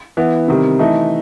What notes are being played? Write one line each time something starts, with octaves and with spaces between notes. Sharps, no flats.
E3 B3 E4
C3 D#3 G3
E3 A3 D#4